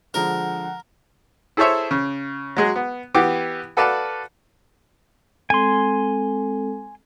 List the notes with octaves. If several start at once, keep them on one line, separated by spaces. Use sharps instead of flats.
D3 F3 G#3 A#4 F#5
E4 G#4 A4 C5 C#5 E5
C#3
F#3 G#3 G#4
B3
E3 B3 G4 D6
F#4 A4 B4 D5 F5 A5
G#3 C4 A4 G#5 C6